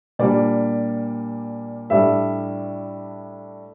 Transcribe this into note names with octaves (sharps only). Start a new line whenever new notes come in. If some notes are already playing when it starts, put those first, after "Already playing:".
A#2 G3 A#3 D4 D5
A2 G3 D4 E5